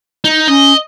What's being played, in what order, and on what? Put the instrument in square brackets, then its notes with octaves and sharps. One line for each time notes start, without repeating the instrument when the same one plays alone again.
[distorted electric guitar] D#4
[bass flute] C#4 [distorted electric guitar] D#5